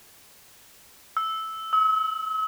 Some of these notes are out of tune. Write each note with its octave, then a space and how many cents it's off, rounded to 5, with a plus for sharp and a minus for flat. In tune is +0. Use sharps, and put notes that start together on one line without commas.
E6 -10
E6 -45